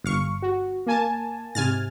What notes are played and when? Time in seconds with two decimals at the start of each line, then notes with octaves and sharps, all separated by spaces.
0.04 G1 F5 C#6
0.42 F#4
0.86 A#3 G#5 A5
1.55 G#2 C3 G#5 F6 A6